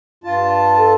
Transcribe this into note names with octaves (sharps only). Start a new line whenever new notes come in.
G2 F4 A5
A4